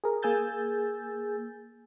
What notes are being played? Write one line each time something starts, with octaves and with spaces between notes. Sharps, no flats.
G#4 A#4
A#3 G#4 G#5 E6 G6 A6